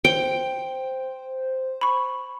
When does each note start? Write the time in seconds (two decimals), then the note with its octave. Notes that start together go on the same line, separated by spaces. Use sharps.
0.05 C5 G5
1.81 B5 C#6